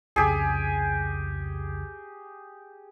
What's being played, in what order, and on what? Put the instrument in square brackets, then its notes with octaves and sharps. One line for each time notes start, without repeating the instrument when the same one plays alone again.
[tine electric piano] C2 F2 C#3 [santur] G4 G#4